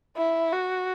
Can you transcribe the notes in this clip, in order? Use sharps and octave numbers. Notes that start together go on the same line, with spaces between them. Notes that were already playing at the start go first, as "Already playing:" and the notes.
E4
F#4